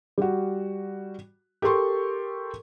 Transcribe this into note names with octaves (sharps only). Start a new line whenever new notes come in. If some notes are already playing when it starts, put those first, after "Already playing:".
G3 F#4
G4 A4 A#4 C6 C#6